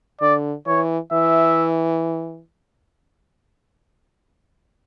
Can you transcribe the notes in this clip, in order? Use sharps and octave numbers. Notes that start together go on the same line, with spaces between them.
D3 D5
E3 C#5
E3 E5